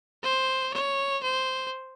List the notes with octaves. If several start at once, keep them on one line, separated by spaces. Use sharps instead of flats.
C5
C#5
C5